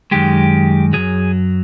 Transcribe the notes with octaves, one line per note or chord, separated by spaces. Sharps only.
F#2 D#3 G#3 G4
F#2 C#3 F#3 G#4